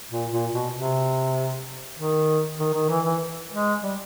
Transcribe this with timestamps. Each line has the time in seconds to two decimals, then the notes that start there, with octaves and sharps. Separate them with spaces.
0.11 A#2
0.31 A#2
0.53 B2
0.73 C3
1.97 D#3
2.59 D#3
2.74 D#3
2.89 E3
3.05 E3
3.52 G#3
3.83 G3